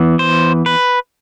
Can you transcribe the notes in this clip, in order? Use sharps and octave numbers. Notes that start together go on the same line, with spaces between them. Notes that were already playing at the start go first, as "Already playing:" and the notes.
Already playing: E3 B3
C5
B4